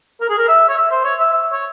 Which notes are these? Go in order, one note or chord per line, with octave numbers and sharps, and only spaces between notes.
A#4
G#4
A#4
E5
C#5
E5
C5
C#5
E5
E5
C#5